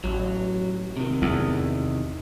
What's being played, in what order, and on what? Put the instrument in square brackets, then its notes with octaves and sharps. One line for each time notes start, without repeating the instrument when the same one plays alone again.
[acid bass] A1 [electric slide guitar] F#3
[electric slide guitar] C3 D#3
[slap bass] E2